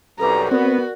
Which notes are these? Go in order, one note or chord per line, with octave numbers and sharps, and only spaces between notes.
C2 F#2 G3 A4 B4 A#5 D6
B3 C4 F#4 A#4 D5